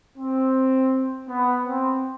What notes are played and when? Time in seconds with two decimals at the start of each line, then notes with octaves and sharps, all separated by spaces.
0.17 C4
1.29 B3
1.65 C4